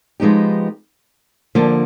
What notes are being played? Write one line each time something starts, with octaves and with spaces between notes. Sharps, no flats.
F3 G#3 B3 D#4 G4
D3 F3 A#3